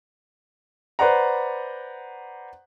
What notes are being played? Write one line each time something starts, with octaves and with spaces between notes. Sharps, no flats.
B4 C5 D5 F#5 A#5